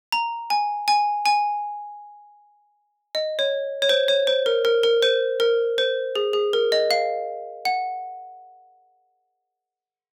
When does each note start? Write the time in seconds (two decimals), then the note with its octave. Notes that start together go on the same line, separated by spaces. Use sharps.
0.12 A#5
0.50 G#5
0.88 G#5
1.26 G#5
3.15 D#5
3.39 C#5
3.82 C#5
3.89 C5
4.08 C#5
4.27 C5
4.46 A#4
4.65 A#4
4.83 A#4
5.02 C5
5.40 A#4
5.78 C5
6.15 G#4
6.33 G#4
6.53 A#4
6.72 D#5
6.91 F5
7.65 F#5